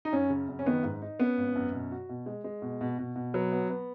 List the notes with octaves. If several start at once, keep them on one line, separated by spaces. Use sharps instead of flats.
D#4
F#2 C#4
C#3
F#2
C#4
D#3 B3
G#2
D#4
B3 C#4
G#1
F#2
B2
F#4
B2
G#3
G#3
B2
B2
B2
B2
F#3 B3
B3
B3